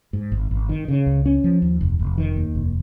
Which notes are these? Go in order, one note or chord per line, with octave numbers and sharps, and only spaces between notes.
G#2
G#1
G#1
D#3
C#3
C#2
C#4
F3
D#2
F1
F1
D#3
D#2
F1